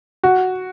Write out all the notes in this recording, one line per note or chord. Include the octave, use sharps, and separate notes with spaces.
F#4